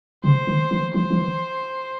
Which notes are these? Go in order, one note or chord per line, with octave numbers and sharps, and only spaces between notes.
C#3 C5
D#3
E3
F3 C5
F3
E3